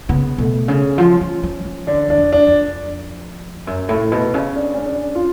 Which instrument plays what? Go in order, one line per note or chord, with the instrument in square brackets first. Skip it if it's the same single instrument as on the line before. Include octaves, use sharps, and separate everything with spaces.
[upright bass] C#3 [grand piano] B3
[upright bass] B2 [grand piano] A3
[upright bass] C#3 [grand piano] C#4
[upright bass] F3
F3
F3
F3
[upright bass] D3 [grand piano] D4
[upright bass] F#2 [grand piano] D4
[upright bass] F2
[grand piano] D4
[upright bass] F2
F#2
A2
B2
C#3
[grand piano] D4
C#4
D4
F4